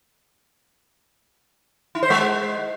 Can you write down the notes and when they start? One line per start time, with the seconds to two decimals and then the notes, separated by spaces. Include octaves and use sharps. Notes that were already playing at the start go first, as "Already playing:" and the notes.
1.95 E4
2.03 C5
2.10 G#3